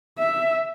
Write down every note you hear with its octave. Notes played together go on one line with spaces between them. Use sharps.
E5